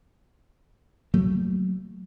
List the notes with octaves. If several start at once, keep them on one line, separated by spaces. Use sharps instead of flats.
F#3 A3 A#3